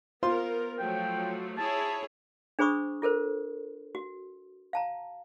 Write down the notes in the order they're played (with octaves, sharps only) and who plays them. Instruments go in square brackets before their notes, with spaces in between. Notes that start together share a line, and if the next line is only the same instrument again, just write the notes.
[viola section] B3 A#4 [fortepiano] F4 C5 C6
[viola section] F3 F#3 A3 [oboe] G5
[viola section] E4 G#4 C#5 [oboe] A5
[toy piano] D4 G#4 C5 B5 C#6 D#6
F4 A4 A#4 C5
F#4
F5 A5 A#5